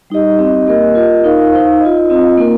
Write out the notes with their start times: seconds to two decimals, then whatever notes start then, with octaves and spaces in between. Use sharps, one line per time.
0.10 G3 D#4 G4 D#5
0.39 C4 G4 D#5
0.67 A#3 G4 A#4 D#5
0.95 F4 A#4 D#5
1.24 D#4 A#4 F5
1.53 D#4 C5 F5
1.80 D#5
1.85 F4
2.09 C4 F4 D#5
2.38 A#3 D#4 A#4